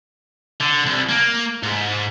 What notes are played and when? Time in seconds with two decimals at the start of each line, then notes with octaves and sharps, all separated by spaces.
0.61 D3
0.86 C2
1.09 A#3
1.63 G#2